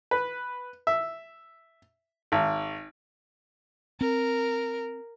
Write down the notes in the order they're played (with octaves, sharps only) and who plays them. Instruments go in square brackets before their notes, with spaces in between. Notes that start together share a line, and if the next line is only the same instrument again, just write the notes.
[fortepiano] B4
E5
G#1
[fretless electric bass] C4 [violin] A#4